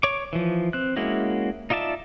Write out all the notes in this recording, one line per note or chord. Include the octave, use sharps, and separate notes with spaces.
C#5 C#6 D6
E3 F3
C4 F#6
G#3 A#3 C#4 E4 F#4
D#4 F4 D5 E5 A5